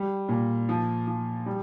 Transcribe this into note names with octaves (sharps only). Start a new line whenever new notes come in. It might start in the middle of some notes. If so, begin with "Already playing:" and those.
Already playing: G3
A#2
F3
F3
G3